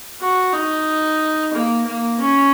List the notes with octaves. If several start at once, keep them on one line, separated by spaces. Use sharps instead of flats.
F#4
D#4
A#3
A#3
C#4